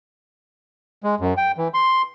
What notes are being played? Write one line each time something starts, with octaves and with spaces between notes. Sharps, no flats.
G#3
F#2
G5
E3
C6